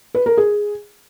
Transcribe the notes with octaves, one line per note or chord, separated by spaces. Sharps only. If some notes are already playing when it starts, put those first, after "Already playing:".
B4
A#4
G#4